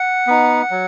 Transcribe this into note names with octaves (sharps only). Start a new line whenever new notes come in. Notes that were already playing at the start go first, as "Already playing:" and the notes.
Already playing: F#5
B3 D#4
F#3